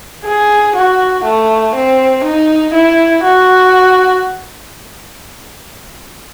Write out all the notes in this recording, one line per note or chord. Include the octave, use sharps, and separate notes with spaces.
G#4
F#4
A3
C4
D#4
E4
F#4